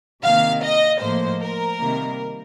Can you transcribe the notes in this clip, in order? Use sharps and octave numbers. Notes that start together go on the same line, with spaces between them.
C3 D#3 A#3 F5
D#5
A2 F3 A#3 C5
A#4
C3 D#3 G3 A#3